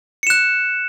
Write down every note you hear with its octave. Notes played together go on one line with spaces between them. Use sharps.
F#6 C#7 E7